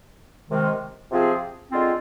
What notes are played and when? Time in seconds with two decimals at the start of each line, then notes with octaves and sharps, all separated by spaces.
0.50 C3 D#3 G#3
1.11 C3 F3 C4 F4 G#4
1.72 D3 G#3 C4 F4